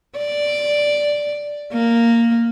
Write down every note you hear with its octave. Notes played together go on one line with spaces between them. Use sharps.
D5
A#3